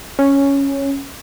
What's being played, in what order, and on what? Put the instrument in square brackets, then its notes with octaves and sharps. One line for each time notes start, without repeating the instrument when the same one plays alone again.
[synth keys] C#4